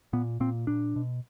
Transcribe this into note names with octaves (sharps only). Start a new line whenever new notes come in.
A#2 B3
A#2 C4
A#2 D4
B2